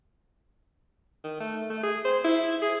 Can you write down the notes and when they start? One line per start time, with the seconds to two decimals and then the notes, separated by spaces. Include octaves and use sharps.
1.24 D#3
1.40 A3
1.70 A3
1.83 G#4
2.05 C5
2.24 E4
2.62 G#4